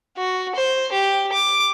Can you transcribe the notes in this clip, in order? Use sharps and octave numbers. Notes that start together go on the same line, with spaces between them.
F#4
C5
G4
D6